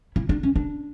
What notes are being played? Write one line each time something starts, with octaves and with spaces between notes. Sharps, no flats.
E4
D4
C#4
D4